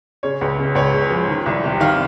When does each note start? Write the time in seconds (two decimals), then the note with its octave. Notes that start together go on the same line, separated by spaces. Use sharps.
0.23 C#3 C#5
0.41 C#2
0.59 C#3
0.75 C#2 C#5
0.93 C#3
1.10 F3
1.29 D#3
1.46 C2
1.64 C3
1.80 D#3 F5